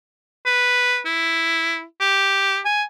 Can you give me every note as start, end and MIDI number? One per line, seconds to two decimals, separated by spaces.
0.46 1.00 71
1.06 1.83 64
2.01 2.59 67
2.65 2.83 80